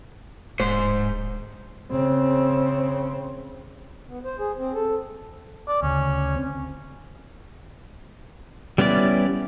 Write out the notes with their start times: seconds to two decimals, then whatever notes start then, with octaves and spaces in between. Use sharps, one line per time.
0.60 D1 G#2 C5
1.91 C#3 C4
4.07 B3
4.24 C5
4.39 G#4
4.58 C4
4.74 A4
5.68 D5
5.83 D2 C#3 C#4
6.36 C4
8.78 G3 B3 C#4 E4 D5